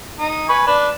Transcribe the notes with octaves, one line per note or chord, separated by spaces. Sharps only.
D#4
B4 G#5 C#6
D4 B4